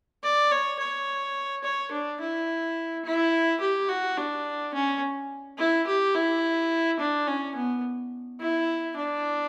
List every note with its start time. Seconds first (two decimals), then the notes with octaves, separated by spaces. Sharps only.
0.23 D5
0.51 C#5
0.79 C#5
1.64 C#5
1.92 D4
2.21 E4
3.05 E4
3.61 G4
3.89 F#4
4.17 D4
4.74 C#4
5.58 E4
5.87 G4
6.15 E4
7.00 D4
7.28 C#4
7.55 B3
8.40 E4
8.96 D4